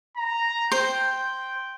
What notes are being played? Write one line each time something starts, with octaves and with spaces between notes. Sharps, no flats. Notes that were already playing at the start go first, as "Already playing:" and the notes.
A#5
C5 G5